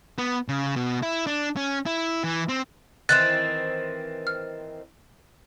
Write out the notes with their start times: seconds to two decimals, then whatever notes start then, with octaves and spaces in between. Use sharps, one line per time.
0.18 B3
0.48 C#3
0.76 B2
1.03 E4
1.27 D4
1.57 C#4
1.86 E4
2.24 E3
2.49 C4
3.09 D#3 E3 C4 F#6 A6
4.27 F6